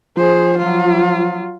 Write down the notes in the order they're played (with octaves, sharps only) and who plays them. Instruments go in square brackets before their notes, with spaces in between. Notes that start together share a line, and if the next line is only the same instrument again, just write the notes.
[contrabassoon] F3 [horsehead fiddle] G#4 C5
[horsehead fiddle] F#3 F4